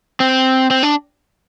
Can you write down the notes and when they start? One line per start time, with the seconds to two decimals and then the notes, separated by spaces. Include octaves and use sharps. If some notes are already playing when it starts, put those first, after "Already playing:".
0.20 C4
0.71 C4
0.83 D4